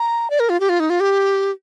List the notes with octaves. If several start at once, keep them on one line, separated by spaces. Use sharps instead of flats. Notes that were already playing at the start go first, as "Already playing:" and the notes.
Already playing: A#5
D5
A#4
F4
G4
F4
D#4
F4
G4